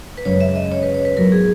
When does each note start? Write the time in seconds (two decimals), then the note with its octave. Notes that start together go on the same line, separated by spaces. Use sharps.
0.18 B4
0.25 F#2 C#3 G#3 C#5
0.41 E5
0.56 D#5
0.72 C#5
0.83 B4
0.94 C#5
1.05 B4
1.17 G#2 F#3 B3 E4 A#4
1.32 G#4